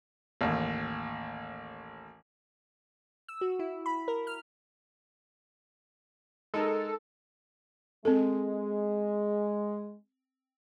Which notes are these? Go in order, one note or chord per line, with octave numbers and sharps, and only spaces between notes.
A1 D#2
E6
F#4
E4
B5
A#4
F6
G#3 D#4 A4 A#4
G#3 C4 A4